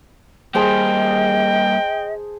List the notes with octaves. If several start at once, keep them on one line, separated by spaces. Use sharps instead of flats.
G3 A#3 G#4 C5 D#5 G5 A5